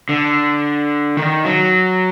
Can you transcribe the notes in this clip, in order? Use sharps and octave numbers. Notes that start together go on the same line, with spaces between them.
D3
D#3
F#3